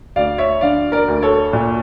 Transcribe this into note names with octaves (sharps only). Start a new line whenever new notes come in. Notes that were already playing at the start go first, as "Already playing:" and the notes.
D2 D5 F5
C#5 E5
D3 D5 F5
A#4 D5
D2
A4 C#5
A#2